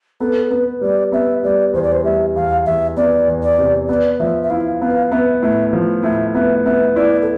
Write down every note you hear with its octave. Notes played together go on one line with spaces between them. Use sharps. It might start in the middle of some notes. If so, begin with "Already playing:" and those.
B3 A4
B3 B4
G3 D5
B3 E5
G3 D5
E2 C5
D5
C5
G3 E5
E2 F5
E2 E5
B3 D5
E2
D5
C3
B3 D5
F3 E5
E5
E4 F5
B3 F5
B3 E5
A2 E5
F3
A2 E5
B3 E5
B3 E5
E4 D5
A4